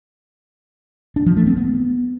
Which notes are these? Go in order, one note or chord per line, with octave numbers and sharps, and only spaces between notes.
D4
F3
A3
C4
B3